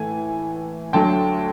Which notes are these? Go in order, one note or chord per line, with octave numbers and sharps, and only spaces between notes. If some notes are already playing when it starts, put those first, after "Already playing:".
Already playing: A2 E3 A3 G#5
D2 D3 F#3 G5 A5